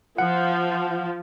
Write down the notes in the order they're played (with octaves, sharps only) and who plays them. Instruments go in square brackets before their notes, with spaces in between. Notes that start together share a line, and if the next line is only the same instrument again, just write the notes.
[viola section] F3 [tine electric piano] F#5